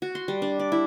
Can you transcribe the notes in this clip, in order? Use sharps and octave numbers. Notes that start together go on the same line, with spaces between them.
F#4
C6
G3
D4
D5
E4